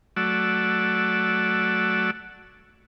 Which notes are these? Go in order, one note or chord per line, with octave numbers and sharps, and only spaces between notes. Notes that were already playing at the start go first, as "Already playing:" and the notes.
F#3 A3 F#4 D5 E6